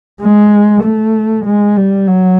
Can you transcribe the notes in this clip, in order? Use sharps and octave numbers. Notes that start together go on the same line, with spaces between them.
G#3
A3
G#3
G3
F#3